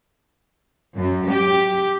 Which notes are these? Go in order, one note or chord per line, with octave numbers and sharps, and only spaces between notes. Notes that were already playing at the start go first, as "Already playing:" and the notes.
F#2
G4